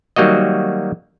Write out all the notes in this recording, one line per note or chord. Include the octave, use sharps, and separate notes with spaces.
D#3 F#3 G3 A#3 F#4 D#5